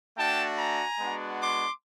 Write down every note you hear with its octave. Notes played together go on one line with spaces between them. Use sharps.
A3 D4 F#4 G5 A5
G#5 A#5
G#3 B3 D4 F#4
C6 D6